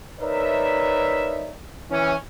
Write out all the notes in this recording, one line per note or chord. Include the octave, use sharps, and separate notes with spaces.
D#4 A#4 B4 C#5 D5 E5
E3 C#4